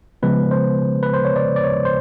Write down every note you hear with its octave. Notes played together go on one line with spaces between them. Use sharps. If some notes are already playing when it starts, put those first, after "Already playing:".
C#3 F3 G#3 B3 B4
C5
B4
C5
C#5
D5
D5
C#5
C5